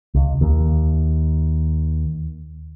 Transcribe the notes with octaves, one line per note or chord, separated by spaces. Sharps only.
C#2
D#2